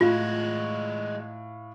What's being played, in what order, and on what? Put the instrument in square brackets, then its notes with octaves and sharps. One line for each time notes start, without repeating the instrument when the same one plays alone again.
[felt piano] A2 F5 [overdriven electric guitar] G#3 F#4 [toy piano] F4